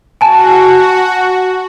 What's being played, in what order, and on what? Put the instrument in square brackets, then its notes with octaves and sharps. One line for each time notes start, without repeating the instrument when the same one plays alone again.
[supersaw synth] F#4 [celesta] G#5 A5